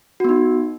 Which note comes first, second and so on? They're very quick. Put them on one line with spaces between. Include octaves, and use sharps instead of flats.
F#4 B3 D#4